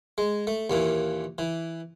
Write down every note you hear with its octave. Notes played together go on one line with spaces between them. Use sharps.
G#3
A3
D#2 A#2 E3
E3